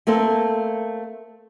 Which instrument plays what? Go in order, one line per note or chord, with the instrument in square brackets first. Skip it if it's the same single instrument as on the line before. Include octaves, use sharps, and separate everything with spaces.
[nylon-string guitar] A3 A#3 C4 A4